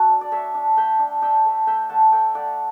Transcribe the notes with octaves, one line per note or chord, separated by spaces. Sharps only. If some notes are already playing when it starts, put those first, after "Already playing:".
Already playing: F#4 A4
D4
D5
A3 C#5 E5
D4
A3 E5 G5
D4
D4 E5 G5
A3
A3 E5 G5
A3 F#5 A5
A3 E5 G5
A3 D5 F#5